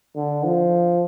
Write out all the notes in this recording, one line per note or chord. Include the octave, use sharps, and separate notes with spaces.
D3
F3